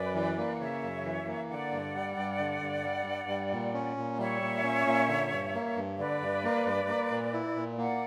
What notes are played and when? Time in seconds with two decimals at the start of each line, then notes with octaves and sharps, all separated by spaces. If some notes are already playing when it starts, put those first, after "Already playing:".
Already playing: F#2 B4 D5
0.15 E3
0.37 A#3
0.54 F#5
0.59 C#3 C#5 E5
0.82 F#2
1.04 E3
1.27 A#3
1.49 D3 D5 F#5
1.72 G2
1.95 G3
2.17 G2
2.39 D3
2.62 G2
2.84 G3
3.06 G2
3.29 G3
3.52 A#2
3.74 C#4
3.97 A#2
4.18 G3 C#5 E5
4.42 A#2
4.64 C#4
4.86 A#2
5.08 D3
5.31 G2
5.54 A#3
5.76 G2
5.98 D3 B4 D5
6.21 G2
6.44 A#3
6.66 G2
6.88 A#3
7.11 A#2
7.33 E4
7.56 A#2
7.78 A#3 D5 F#5